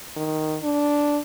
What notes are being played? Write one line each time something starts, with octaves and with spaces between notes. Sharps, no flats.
D#3
D4